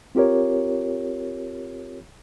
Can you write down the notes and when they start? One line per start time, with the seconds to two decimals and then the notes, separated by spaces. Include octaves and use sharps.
0.15 C4 F4 G4 A#4 C#5